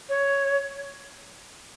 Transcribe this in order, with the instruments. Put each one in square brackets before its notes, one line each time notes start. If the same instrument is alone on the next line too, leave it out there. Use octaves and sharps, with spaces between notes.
[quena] C#5